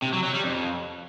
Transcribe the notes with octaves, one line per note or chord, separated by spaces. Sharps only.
C3
F#3
F#3
G3
F2